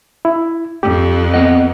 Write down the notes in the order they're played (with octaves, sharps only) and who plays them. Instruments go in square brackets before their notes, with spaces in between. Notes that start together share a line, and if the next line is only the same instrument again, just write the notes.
[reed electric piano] E4
[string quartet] F2 [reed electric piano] G4
[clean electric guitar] B3 C4 D#5 [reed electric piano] F#5